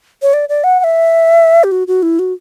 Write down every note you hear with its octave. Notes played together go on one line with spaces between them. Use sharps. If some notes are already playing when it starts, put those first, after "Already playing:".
C#5
D5
D5
F#5
F#5
E5
G4
F#4
F#4
E4
F#4